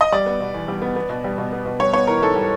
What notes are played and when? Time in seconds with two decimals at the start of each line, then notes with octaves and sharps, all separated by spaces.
0.01 D#5
0.12 G3 D5
0.26 B3
0.40 B2
0.54 E2
0.68 G3
0.82 B3
0.96 B3
1.09 B2
1.24 G3
1.38 B2
1.53 B3
1.66 B2
1.80 G3 C#5
1.93 B3 C#5
2.07 E3 A#4
2.22 G#2 A4
2.35 G3